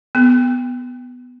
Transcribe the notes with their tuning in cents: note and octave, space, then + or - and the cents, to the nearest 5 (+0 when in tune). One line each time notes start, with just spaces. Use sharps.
B3 +10